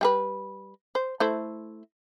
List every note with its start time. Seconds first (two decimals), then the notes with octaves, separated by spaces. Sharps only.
0.01 G3 G#4 B4
0.95 C5
1.20 A3 E4 C5